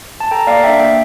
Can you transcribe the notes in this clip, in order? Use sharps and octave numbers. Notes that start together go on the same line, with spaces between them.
A5
A4 G5 A#5
A#3 D5 F5
D4 E5 G5
A#3 E5 G5